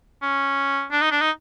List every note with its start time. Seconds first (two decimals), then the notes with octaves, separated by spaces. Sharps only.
0.22 C#4
0.91 D4
1.01 D#4
1.11 D4
1.21 D#4